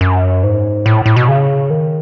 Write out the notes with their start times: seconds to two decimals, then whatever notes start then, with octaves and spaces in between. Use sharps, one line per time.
0.01 F#2
0.43 G#2
0.86 A2
1.06 A2
1.16 B2
1.28 C#3
1.70 D#3